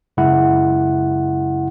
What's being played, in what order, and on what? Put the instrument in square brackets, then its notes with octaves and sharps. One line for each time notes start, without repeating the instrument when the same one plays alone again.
[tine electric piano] F#2 C#3 G#3 E4 F#5